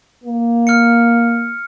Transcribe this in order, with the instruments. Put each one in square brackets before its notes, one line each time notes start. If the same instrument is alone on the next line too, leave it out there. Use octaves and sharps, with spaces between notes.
[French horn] A#3
[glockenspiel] F6 C#7